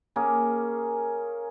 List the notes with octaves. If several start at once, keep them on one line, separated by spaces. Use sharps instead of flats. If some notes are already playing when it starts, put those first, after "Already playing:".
A#3 C#4 G#4